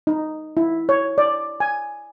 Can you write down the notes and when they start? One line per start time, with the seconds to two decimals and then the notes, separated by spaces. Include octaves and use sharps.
0.07 D#4
0.57 E4
0.89 C#5
1.18 D5
1.60 G#5